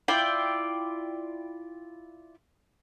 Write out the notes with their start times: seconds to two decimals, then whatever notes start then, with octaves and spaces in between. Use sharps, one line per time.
0.08 E4 F4 D5 G5